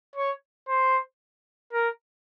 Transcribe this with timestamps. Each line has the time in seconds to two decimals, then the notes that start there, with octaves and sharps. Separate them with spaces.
0.16 C#5
0.68 C5
1.73 A#4